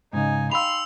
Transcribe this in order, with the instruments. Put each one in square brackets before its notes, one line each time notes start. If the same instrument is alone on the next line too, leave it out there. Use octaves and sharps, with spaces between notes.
[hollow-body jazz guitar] G#2 C#3 [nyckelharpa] D#4 G#5
[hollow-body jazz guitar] F5 G5 B5 [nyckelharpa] C6 [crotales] E6 F7